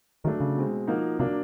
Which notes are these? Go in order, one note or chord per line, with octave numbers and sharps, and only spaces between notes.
D#3 F#3 A3 D4
C#3
B2 G#3 C4
F3 A#3 D#4 F#4
C3 F#3 A#3 D4